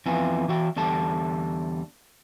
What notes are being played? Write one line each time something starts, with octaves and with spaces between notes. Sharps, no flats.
F2 E3 B3 E4 F4 G#5
E3 F#4 G5
E2 D3 G3 A5